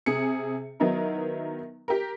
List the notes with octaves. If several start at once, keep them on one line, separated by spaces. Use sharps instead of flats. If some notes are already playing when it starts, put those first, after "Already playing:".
C3 G#4 C#7
D#3 F#3 B3 D#4 E4 A#4
G4 A#4